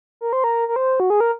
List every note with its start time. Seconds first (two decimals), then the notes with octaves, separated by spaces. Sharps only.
0.21 A#4
0.33 C5
0.44 A#4
0.68 A#4
0.76 C5
1.00 F#4
1.10 G#4
1.20 A#4